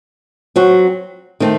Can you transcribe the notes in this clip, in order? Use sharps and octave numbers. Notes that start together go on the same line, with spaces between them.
F#3 C4 F#4
D#3 A3 C4